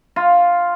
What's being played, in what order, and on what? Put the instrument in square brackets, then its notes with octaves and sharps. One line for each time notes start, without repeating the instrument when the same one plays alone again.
[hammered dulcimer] F4